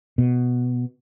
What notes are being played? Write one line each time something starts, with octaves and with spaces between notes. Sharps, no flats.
B2